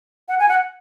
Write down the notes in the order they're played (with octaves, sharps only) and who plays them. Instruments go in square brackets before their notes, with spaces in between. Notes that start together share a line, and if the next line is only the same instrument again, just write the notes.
[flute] F#5
G#5
F#5